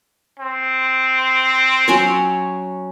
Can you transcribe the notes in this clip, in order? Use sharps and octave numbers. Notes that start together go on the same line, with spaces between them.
C4
F#3 C#4 C#5